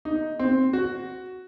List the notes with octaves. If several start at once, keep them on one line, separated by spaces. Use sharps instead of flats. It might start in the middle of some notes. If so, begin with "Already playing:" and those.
D#4
C4
F#4